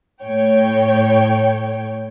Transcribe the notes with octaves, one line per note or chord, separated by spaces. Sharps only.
A2 C#5 G5